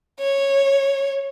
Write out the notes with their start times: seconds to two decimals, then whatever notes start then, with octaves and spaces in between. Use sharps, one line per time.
0.20 C#5